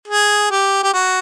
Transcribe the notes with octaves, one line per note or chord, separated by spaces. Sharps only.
G#4
G4
G4
F#4